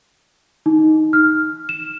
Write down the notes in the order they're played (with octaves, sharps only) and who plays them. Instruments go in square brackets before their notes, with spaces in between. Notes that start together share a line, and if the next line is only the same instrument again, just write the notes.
[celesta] D#4
F6
E7